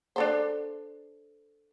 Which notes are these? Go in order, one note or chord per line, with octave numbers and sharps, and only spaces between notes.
D4 A4 C5